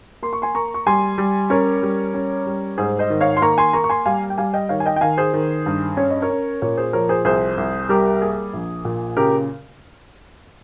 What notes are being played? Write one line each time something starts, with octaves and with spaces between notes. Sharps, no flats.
A#3 C6
C#6
G#5 C6
A#3 A#5 C#6
C#6
G3 G#5 C6
G3
C#4 A#4 C#5
G3
C#4
G3
G#2 G#4 C5
C5 D#5
D#3
C#5 F5
C6
A#3 A#5 C#6
G#5 C6
A#3 A#5 C#6
C#6
G#5 C6
G3 F5 G#5
G5
G3 F5 G#5
D#5 G5
D#3 C#5 F5
G#5
D#5 G5
G5
D#3 F5 G#5
G#4 C5
D#3
G2
C#4 C#5
D#5
A#4 C#5
C#4
A#2 A#4 C#5
G#4 C5
F3 A#4 C#5
G#4 C5
C2 G#4 C5
C2
G3 G4 A#4
A#3 G#4
A#1
A#2
C#3 G4 A#4